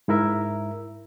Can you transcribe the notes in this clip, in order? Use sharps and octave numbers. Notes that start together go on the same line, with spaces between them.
G#2 E4 A#4 E5